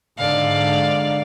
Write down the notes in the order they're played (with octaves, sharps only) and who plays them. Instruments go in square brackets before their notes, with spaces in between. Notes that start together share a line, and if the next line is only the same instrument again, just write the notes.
[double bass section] G#2 D3 [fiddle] D5 F5